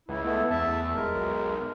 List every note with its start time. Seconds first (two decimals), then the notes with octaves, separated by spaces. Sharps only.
0.09 C#2 E4
0.24 A3 B3 E4
0.50 E2 E5 A5
0.95 D#1 G#3 A#4
1.14 B1